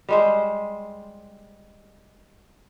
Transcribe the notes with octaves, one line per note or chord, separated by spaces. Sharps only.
G3 G#3 C5